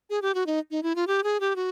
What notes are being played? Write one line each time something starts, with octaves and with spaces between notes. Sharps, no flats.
G#4
G4
F#4
D#4
D#4
E4
F4
G4
G#4
G4
F#4